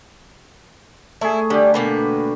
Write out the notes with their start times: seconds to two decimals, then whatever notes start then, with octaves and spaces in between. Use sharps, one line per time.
1.21 A3 E4 G#4
1.50 D3 G3 G4
1.74 B2 A#3 B4